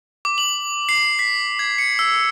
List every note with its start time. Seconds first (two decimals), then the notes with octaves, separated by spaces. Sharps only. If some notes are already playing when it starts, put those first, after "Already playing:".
0.25 D6
0.38 F#7
0.89 C7
1.19 B6
1.59 G#6
1.78 C#7
1.99 E6